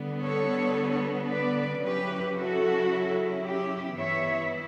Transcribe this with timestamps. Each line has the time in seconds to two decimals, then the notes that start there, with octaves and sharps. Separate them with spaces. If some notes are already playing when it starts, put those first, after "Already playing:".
Already playing: D3 G3 B3
0.24 A4 C#5
1.30 B4 D5
1.84 C#3 F#3 C#4 E4 G4 B4
2.37 F#4 A4
3.44 G4
3.97 G2 E3 B3 E4 C#5 E5